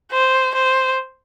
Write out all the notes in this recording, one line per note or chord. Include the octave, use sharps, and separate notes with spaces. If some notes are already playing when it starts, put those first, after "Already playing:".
C5
C5